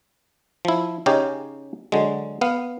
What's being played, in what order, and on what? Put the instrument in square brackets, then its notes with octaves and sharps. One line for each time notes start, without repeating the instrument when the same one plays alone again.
[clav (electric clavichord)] F3 E4
C#3 C#4 D#4 G4 G#4
D3 F#3 G#3
B3 F5